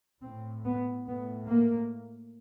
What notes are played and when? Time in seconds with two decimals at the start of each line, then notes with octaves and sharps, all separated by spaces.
0.22 A2 C4
0.64 B3
1.07 A2 B3
1.49 A#3